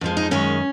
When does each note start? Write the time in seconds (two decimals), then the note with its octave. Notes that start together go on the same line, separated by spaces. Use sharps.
0.01 F2 F3 G#3
0.17 D#4
0.31 F#2 D#3 G#3 C#4